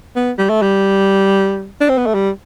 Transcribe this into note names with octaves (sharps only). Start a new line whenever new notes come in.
B3
G3
A3
G3
D4
C4
B3
A3
G3